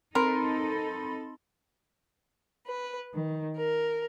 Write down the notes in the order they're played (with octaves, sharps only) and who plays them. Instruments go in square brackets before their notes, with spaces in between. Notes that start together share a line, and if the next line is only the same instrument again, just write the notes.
[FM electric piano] C4 B5 C6 [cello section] D#4 A4 [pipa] A#4
[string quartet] B4
D#3
A#4